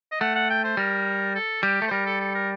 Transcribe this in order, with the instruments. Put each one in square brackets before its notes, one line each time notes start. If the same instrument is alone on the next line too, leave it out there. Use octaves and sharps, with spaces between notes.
[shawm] D#5
[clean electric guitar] A3 [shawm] F#5
[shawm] F#5
G5
C5
[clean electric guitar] G3 [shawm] A#4
[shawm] A4
[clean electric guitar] G3 [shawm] G4
[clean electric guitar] A3
[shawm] C5
[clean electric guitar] G3 [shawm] A#4
[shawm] A4
A4
A#4